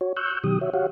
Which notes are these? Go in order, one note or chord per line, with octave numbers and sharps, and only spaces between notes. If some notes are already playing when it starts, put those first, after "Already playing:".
F#4 C#5
C#6 E6 F#6 G6
B2 D#3 F#3 G4 D#6
F#4 C#5 E5
F#4 G4 C#5 F5 F#5